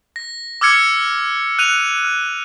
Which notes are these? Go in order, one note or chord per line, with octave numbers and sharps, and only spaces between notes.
A#6
D6 E6 F6 G#6 C#7
F#6 D#7 F7
F6